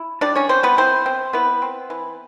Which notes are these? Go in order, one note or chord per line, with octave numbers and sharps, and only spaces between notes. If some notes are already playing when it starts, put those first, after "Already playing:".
Already playing: E4
G3 D4 D5
C#4 C#5
G3 C4 C5
B3 B4
C4 E4 C5
C4
B3 E4 B4
C4
E3